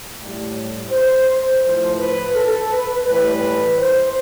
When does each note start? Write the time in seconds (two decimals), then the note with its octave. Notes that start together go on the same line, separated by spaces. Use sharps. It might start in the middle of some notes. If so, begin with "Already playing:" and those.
0.19 A2 G3
0.89 C5
1.63 A2 F3 C5
1.99 B4
2.35 A4
2.70 B4
3.06 A2 E3 G3 B4
3.79 C5